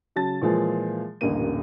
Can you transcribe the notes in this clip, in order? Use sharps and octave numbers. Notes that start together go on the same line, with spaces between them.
C#3 F#3 A5 A6
A#2 E3 F3 G#3 G#4
D#1 A1 G2 D3 A#3 D#7